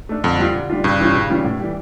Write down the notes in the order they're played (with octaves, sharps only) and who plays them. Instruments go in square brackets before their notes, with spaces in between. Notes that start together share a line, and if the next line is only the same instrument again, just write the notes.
[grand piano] A3 D4
[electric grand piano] F2 [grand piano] D3
[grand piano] G3 D4 F4
D3
G3 D4 F4
[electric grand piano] G2 [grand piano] C#3
[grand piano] E3 G3 C#4 F4
C#3
E3 G3 C#4 F4
A2
E3 G3